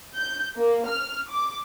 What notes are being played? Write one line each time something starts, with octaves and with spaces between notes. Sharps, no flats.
G6
A#3
F6
D6